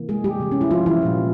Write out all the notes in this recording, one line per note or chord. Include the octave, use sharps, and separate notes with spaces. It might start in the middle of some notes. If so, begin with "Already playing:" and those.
Already playing: C3 E3 A#3
G#3 G#4
G3 G4
C3 E3 G3
C#4
E4
F3 F4
E3 E4
A#2 G#3